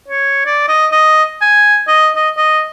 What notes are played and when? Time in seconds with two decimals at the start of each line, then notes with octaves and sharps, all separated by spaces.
0.08 C#5
0.46 D5
0.68 D#5
0.91 D#5
1.41 G#5
1.87 D#5
2.15 D#5
2.37 D#5